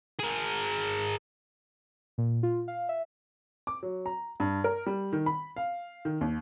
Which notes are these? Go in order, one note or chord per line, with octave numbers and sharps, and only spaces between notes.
G#4 A#4
A#2
F4
F5
E5
D6
F#3
A#5
G2
A#4
G3
D#3
B5
F5
D#3
D#2